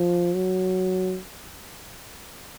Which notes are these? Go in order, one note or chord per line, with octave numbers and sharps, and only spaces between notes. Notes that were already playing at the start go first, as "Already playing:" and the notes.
Already playing: F3
F#3